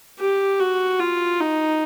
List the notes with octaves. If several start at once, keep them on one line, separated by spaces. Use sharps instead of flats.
G4
F#4
F4
D#4